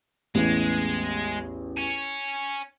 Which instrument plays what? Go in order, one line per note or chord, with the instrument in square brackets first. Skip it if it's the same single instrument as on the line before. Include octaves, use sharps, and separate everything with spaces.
[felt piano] A1 E2 [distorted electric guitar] G#3
[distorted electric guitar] C#5 G#5